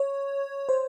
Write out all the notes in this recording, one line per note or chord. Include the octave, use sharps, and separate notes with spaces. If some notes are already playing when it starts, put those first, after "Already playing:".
Already playing: C#5
C5